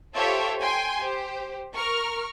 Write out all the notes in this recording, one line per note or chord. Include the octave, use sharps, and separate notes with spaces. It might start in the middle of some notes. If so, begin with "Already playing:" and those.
F4 G4 A4 C5 C#5 E5
G5 G#5 C6
G4 C5
A#4 C#6 F6